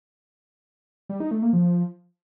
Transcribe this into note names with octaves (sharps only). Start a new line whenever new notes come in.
G3
D#4
A3
A#3
F3